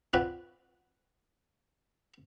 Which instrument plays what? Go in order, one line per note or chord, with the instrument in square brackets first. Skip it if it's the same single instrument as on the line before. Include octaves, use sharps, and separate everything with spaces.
[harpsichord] C4 D4 F4 F#4 B4